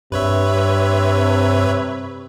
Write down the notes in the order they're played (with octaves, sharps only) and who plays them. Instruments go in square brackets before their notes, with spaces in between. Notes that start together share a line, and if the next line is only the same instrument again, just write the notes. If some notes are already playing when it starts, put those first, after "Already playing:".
[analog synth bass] G2 [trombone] C3 [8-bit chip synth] B4 C#5 E5